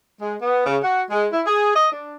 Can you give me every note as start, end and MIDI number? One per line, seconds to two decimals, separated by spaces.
0.21 0.36 56
0.42 0.66 59
0.66 0.77 49
0.82 1.02 66
1.11 1.26 56
1.32 1.42 64
1.46 1.72 68
1.75 1.88 75
1.92 2.16 62